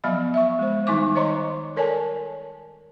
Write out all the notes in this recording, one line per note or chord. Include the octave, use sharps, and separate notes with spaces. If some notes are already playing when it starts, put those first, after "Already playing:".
F3 F#3 B3 D#5 F5 B5
E5 C#6
G#3 C5
D#3 G3 D#4 G#5 C#6 D6
C5 C#5 D#5 A#5 C6 C#6
A4 A#4 C#5 D5 G#5 A5